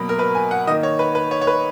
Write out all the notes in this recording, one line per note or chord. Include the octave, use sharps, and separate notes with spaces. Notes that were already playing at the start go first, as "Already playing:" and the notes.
Already playing: B2 F#3 A#3 B5
A#4
B4
G#5
F#5
D#3 A#3 D#5
C#5
B4
B4
C#5
C#5
B4